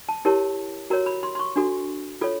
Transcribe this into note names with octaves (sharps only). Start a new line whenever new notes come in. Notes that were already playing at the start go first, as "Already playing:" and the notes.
A5
E4 G4 A#4 C#5 A5
F#4 A#4 C#5 A#5
B5
C6
C6
C#6
D4 F#4 A4
F4 A4 C#5